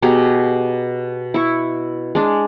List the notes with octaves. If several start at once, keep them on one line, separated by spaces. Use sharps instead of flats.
B2 G4 G#4 A#5
E4 C#6
G#3 D4